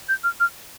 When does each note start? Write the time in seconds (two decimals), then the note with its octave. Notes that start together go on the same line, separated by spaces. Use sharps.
0.09 G6
0.24 F6
0.40 F6